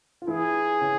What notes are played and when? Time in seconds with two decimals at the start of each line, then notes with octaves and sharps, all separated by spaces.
0.22 F4
0.27 E3 E4 G#4
0.81 C#3 C#4